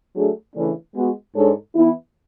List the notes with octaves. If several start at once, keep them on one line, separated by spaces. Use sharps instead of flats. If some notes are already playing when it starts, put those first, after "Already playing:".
F#3 A3 D4 G#4
C#3 E3 A3 D4
G#3 B3 F#4
G#2 G#3 D4 A4 C#5
E3 B3 E4